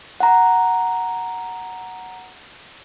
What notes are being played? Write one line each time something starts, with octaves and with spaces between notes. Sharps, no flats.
F#5 A#5